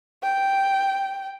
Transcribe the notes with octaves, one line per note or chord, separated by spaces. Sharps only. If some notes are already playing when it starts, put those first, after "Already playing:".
G5